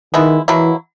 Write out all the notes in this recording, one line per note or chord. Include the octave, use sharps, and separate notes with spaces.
D#3 G#3 B3 E4
B2 E3 F#3 A#3 E4